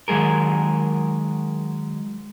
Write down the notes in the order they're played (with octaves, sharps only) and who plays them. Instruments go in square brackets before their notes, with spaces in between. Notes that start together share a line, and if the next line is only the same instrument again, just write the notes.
[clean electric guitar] D#3 F#3 G#3 G#4 A#4